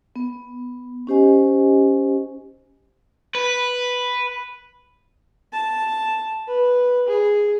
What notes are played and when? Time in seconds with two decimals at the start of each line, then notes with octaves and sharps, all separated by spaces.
0.16 B3
1.07 C#4 D#4 G4 C5 D#5 G#5
3.35 B4
5.53 A5
6.48 B4
7.08 G#4